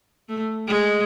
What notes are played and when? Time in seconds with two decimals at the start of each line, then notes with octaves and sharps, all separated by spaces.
0.29 A3
0.67 G#3